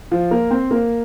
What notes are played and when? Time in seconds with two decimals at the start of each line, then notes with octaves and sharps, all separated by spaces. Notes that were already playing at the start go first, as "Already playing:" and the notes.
0.11 F3 F4
0.31 A#3 A#4
0.51 C4 C5
0.71 A#3 A#4